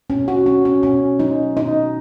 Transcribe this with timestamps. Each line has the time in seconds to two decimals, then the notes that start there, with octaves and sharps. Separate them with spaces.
0.10 B2 C#4
0.28 F#4
0.46 F#3 C#4
0.65 C#4
0.83 B2 C#4
1.19 F#3 D#4
1.57 B2 D#4